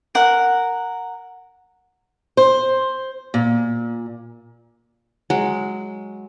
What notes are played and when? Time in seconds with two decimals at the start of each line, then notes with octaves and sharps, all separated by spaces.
0.15 A#4 F#5
2.37 C5
3.34 A#2
5.30 F#3 G#3